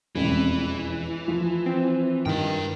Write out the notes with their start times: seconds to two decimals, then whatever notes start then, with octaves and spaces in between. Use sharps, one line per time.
0.15 E1 A1 F2 E3
1.28 F3
1.66 C4
2.26 G2 D#3 B4 G5